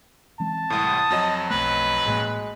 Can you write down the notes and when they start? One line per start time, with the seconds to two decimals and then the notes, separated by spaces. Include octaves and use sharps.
0.40 E3 G#3 C4 A5
0.70 C2 A2 D#6
1.10 F2 F#3 D#5
1.50 B1 A3 B4
2.06 A1 A2 G#3 A#3